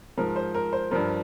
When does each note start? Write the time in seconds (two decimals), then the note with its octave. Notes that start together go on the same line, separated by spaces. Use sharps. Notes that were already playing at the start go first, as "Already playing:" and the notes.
0.17 G#2 F3 A#4
0.36 C5
0.55 A#4
0.73 C5
0.91 G2 F3 A#4